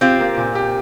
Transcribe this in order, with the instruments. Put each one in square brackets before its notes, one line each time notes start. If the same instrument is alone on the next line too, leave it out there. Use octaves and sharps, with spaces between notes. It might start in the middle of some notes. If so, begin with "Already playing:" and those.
[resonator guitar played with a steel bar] C4 F4 [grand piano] G4
[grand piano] A#3
A#2
G4